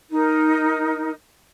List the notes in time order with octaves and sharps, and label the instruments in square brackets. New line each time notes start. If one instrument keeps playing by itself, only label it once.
[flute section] D#4 A#4